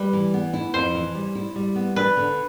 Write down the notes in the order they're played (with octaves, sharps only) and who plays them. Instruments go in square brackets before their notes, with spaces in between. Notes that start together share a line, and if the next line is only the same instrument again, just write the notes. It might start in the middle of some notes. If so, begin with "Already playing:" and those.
Already playing: [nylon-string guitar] G3 [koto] B4
[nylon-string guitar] E3
B3
E4
[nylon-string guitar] F2 [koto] C5
[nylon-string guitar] E3
G3
E4
G3
B3
[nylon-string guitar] D4 [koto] B4
[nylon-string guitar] D3